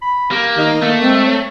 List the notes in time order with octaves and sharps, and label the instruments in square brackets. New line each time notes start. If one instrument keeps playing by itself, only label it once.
[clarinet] B5
[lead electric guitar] A#3 [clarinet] G4
[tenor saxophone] D#3 [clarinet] D#5
[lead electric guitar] A3 [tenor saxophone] A#3
[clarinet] G#3 [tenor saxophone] C4
[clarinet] C#5